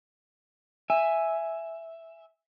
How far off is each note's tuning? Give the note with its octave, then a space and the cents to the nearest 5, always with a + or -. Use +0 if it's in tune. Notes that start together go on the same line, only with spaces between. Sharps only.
E5 +0 G#5 +0